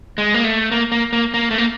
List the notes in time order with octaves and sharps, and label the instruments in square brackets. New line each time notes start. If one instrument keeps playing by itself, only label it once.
[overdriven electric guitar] G#3
A#3
A3
A#3
A#3
A#3
A#3
A3
A#3